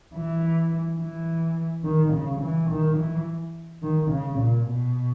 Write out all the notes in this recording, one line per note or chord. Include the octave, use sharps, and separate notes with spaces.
E3
E3
D#3
C#3
E3
D#3
E3
D#3
C#3
A#2
B2